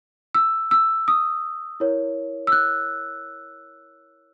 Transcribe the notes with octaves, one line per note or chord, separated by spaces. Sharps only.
E6
E6
D#6
E4 A#4 C#5
E6
F#6